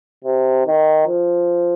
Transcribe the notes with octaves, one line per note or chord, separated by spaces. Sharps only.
C3
D#3
F3